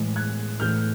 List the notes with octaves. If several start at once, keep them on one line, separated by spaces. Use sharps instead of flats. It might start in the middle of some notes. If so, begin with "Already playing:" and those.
Already playing: A2 E3 G#3
F#6 G#6
A2 E3 A3 F6 G6